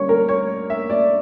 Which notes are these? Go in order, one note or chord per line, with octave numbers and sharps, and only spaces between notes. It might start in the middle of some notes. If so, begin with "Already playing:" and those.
Already playing: D3 G3 A#3 C#4 C#5
A#4
C#5
E5
D5